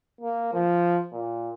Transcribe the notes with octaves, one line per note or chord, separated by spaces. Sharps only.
A#3
F3
A#2